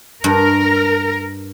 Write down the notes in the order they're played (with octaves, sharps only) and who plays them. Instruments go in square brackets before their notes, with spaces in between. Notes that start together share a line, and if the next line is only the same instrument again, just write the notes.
[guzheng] G2 [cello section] A#4